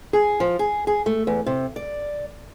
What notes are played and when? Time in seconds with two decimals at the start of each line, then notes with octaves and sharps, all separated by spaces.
0.13 G#4
0.40 F3
0.59 G#4
0.87 G#4
1.06 A3
1.27 E2
1.46 C3
1.76 D5